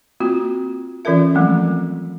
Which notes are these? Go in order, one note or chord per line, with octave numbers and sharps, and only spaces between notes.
A#3 C4 F4 F#4
E3 C#4 F4 A4 A#4 E5
F3 F#3 G#3 A3 C4